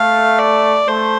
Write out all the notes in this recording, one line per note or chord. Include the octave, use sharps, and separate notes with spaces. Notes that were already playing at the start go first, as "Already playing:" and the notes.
Already playing: A3 F5
D5
A3 C5